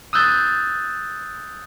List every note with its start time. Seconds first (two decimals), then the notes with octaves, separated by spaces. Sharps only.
0.13 D#6 E6 F#6 G6 A6